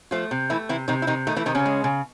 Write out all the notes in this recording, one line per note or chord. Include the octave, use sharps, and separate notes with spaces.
F3 A3 F4
C3
E3 A3 E4
C3 E3 E4
C3 D#3 D#4
E4
C3 D#3 D#4
D#3 A3 D#4
E3 E4
C3 D#3 D#4
C#3 C#4
G#3
C#3